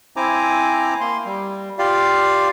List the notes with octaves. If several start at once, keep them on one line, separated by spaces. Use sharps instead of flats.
C4 E4 C5 G#5 A#5 D6
A#3 C6
G3
F4 G4 D5 F5